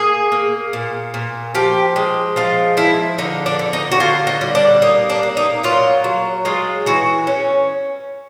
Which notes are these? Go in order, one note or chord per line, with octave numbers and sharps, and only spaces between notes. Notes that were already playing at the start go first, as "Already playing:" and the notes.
Already playing: A#3 G#4
A#3
A#2
A#2
F3 G4
G#3
F3 F4
F3 E4
D3 D#4
D4
D3
D#4
F#4
D3 F4
D#4
G3
D4
A#3 D#4
D4
A#3
D#4
F#3 F4
F#3
G#3 F4
E3 F#4
C#4